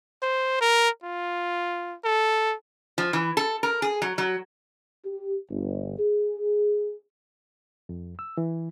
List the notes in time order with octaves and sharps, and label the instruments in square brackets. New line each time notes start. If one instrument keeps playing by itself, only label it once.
[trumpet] C5
A#4
F4
A4
[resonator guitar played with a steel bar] F3
E3
A4
A#4
G#4
F#3
F#3
[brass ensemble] G4
G1
G#4
[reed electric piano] F2
E6
E3